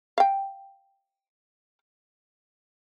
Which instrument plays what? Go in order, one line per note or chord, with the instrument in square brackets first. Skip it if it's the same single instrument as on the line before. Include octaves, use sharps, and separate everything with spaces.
[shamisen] F5 G5